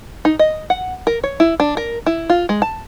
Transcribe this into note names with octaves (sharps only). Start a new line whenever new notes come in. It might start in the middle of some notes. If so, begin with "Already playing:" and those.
D#4
D#5
F#5
A#4
C#5
E4
D4
A#4
E4
F4
G#3
A5